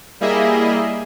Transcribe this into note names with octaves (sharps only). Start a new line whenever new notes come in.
G3 A#3 E4 G#4 D#5 E5